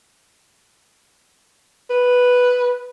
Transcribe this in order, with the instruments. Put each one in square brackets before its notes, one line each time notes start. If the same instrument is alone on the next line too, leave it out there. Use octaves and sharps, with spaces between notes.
[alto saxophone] B4